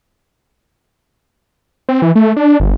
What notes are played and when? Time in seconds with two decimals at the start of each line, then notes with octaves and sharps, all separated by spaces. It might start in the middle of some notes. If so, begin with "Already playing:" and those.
1.89 C4
2.02 E3
2.15 A3
2.37 D4
2.60 G1